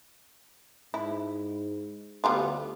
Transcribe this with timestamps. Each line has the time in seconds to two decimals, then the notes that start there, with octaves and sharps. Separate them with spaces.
0.94 G#2 E4
2.24 D2 G3 B3 F4